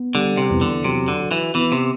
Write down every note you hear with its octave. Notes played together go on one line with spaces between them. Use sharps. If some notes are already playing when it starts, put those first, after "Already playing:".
Already playing: B3
D3 G3
C3
E2
D3
C3 F#3
D3
F#4
E3
E3 B3
C3